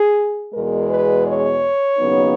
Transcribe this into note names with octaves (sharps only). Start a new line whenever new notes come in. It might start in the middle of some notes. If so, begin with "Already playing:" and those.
Already playing: G#4
E2 B2 G#3 A#4
B4
C#5
D#2 C#3 F#3 B3 D#4